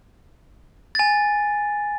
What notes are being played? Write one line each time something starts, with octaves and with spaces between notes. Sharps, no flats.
G#5 A6